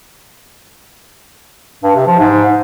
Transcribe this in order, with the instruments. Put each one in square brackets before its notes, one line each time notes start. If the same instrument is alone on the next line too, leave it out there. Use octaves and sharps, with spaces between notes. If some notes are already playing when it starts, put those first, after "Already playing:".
[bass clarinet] G2
C3
F3
G#2